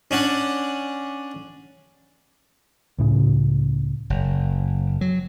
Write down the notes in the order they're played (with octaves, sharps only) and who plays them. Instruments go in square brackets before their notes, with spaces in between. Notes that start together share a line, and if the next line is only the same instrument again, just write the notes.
[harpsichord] C#4 D4 F#5
[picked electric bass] C#2 A2 C#3
[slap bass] F#1
F#3